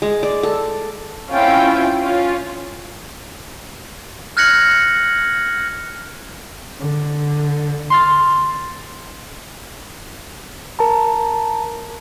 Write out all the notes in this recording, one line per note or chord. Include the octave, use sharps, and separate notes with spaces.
G#3
D5
A4
C4 C#4 E4 F4 G5
C#4 F4
F6 F#6 G#6 A#6 C#7 F#7
D3
C6 F6 A6
A#4 A5 A#5